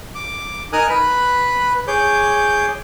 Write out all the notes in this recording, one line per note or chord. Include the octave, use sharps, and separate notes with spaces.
D6
D#4 A#4 G#5 D#6 F6 F#6
B4 B5 F#6
G#4 C#5 D6 G6